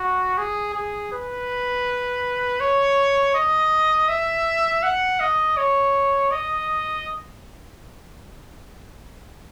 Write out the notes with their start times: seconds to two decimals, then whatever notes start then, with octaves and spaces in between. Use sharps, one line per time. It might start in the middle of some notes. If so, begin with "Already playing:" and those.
Already playing: F#4
0.38 G#4
0.74 G#4
1.12 B4
2.60 C#5
3.34 D#5
4.09 E5
4.83 F#5
5.20 D#5
5.57 C#5
6.31 D#5